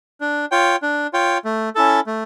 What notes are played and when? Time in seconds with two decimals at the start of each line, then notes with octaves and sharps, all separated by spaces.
0.21 D4
0.51 F4 C#5 G5
0.82 D4
1.13 F4 C#5 G5
1.45 A3
1.75 C#4 E4 A4
2.07 A3